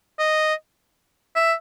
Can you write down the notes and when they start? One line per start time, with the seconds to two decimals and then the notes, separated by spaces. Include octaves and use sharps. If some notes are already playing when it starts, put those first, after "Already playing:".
0.19 D#5
1.36 E5